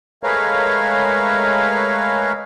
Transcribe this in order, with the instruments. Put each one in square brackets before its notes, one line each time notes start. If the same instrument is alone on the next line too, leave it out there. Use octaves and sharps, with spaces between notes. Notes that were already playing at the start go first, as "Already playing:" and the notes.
[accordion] G#3 A3 A#4 B4 C#5 F5